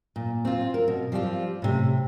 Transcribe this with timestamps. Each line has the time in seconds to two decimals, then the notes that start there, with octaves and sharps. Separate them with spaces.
0.16 A#2
0.45 C4 F4
0.74 A#4
0.88 B2
1.12 F3 G3 C4 F4
1.62 A2 C3